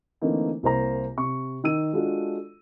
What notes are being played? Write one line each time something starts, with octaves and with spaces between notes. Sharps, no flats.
D3 E3 A3 A#3 C4 D#4
C2 A#3 C5 A#5
C3 C#6
D#3 E6 D#7
G#3 D4 F4 F#4 A4